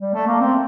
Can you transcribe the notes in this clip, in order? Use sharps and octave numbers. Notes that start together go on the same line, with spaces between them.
G3
A3
A#3
C4